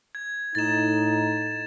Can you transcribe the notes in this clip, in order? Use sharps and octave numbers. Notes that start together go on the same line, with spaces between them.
G#6
A2 D#4 A6 E7